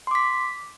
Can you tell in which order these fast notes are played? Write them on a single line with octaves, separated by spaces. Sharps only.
C6 D6 B6